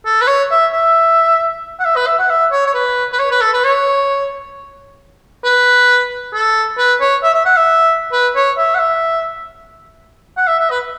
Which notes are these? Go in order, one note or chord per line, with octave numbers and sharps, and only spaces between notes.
A4
B4
C#5
E5
E5
F#5
E5
B4
E5
F#5
E5
C#5
C#5
B4
B4
C#5
B4
A4
B4
C#5
B4
A4
B4
C#5
E5
E5
F#5
E5
B4
C#5
E5
F#5
E5
F#5
E5
E5
B4